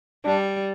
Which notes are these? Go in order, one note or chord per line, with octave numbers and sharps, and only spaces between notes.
G3 D4